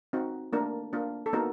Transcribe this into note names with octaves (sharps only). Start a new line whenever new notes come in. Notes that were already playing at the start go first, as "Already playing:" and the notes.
C4 D#4 F#4
A3 A#3 D4 F4 A#4
A#3 D4 F4
A4
A#3 B3 D#4 F#4 A#4